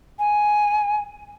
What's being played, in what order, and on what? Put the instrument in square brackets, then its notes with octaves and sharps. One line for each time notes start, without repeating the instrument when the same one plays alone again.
[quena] G#5